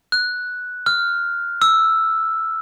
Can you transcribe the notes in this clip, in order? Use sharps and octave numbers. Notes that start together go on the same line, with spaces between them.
F#6
F6
E6